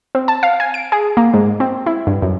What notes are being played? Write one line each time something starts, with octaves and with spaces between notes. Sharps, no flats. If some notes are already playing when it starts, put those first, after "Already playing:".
C4
A5
F5
G#5
D7
G#4
A#3
G#2
C4
E4
G2
F#2